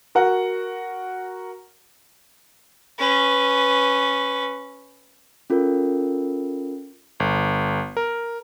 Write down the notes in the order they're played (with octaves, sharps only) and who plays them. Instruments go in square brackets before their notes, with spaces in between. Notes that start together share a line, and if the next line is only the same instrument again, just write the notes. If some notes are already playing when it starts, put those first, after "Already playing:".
[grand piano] F#4 A#4 F#5
[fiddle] C#4 B4
[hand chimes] C#4 F4 A4 A#4
[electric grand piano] G1
A#4